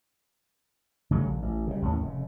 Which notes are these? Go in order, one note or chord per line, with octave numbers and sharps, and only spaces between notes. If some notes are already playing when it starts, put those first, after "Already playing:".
C#3 F#3 G3 A3
A#1
A1
C#3 G3
D#2 A2 C#4
F1 C#3